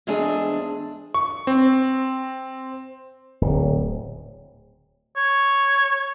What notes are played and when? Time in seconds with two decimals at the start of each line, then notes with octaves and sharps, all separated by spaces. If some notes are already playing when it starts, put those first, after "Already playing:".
0.07 E2 G#2 C4 D4 G#4
1.14 C#6
1.47 C4
3.41 D1
5.16 C#5